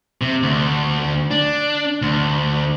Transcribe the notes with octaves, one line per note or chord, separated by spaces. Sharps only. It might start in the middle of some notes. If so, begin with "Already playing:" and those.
C3
D2
D4
D2